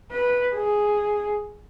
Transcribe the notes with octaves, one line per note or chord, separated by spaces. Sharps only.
B4
G#4